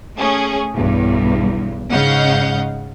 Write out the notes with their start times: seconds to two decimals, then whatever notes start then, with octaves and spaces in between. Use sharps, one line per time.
0.17 A3 C#4 G#4
0.76 B1 E2 G2
1.92 G#2 C#3 D#5 F5 F#5 G6